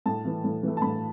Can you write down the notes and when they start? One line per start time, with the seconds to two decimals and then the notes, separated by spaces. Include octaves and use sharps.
0.06 A2 A5
0.25 E3 A3
0.44 A2
0.63 E3 A3
0.77 A5
0.82 A2 B5